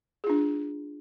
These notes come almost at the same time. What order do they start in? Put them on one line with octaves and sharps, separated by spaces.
G#4 F4 D4